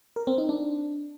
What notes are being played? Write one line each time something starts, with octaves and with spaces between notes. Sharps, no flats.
A#4
C4
D#4
D4